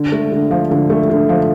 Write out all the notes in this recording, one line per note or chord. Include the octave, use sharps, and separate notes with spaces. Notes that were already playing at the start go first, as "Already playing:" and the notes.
Already playing: D3
A3
D3
F3
D3
A3
D3
F3